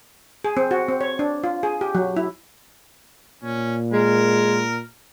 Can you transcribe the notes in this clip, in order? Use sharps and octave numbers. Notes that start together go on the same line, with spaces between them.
G#4
C4
F#4
C4
C#5
D4
F4
G#4
G4
F#3
E4
A#2 C#4
G#3 A#4